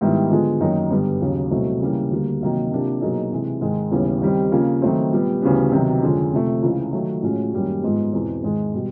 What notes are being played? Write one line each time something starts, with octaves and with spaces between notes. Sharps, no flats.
G#2 D#3 G3 B3 E4
D3 F3 G#3 B3
F#2 D#3 F#3 A#3 D#4
G2 D3 G3 B3
D#2 C#3 F#3
C2 B2 F#3 A3 C4
C#3 E3 G3 A#3
D2 D3 G3 A#3
C3 D#3 F#3 A#3 D#4
C3 F3 A#3 D4 G4
B2 F#3 A#3 D#4 G#4
C3 E3 G#3
G#2 D#3 G#3
D#2 C#3 E3 G3 B3
D#3 G3 C4
C#3 F3 A#3
D#3 F#3 A3 C4
A#2 G3 B3
D2 C#3 E3 G3 B3
C3 D#3 F#3 B3
F2 D3 F3 G#3 C#4
C3 F3 A3
C#2 C#3 E3 G#3
D#3 F#3 A3
A2 F3 G#3 C#4 F#4
F#2 D#3 G3 A#3 C#4
G#2 F3 G#3 B3
E2 B2 G#3 C4
G#2 D#3 G#3
B2 G3